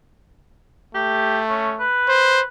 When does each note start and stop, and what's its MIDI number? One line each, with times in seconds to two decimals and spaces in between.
0.95 1.87 57
0.95 1.39 67
1.49 1.72 61
1.80 2.48 71
2.09 2.41 72